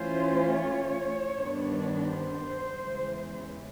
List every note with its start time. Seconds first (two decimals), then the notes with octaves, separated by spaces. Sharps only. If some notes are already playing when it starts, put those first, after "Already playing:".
Already playing: E3 A3 C#4 F4 C5
0.60 C#5
1.34 G2 D#3 G3 B3 D4
2.06 C5
2.81 E2 C#3 E3 G#3